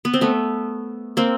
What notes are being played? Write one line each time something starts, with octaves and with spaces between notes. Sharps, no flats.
B3
C4
A3 B3
A#3 C4